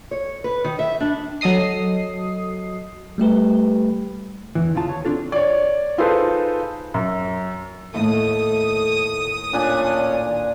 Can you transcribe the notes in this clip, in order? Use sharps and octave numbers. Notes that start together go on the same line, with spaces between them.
C#5
B4
D#3
E5
D4
F#3 A4 D#5 D#6 C7
G3 A3 G4 B4
E2 G2 E3
D#2 C#3 F4 A5
C#5
C4 D4 F4 A4
C#5 D5
D#4 F4 G#4 A4 B4 C5
F#2
D#2 A2 A3 D#6
A#2 C#4 D4 G#5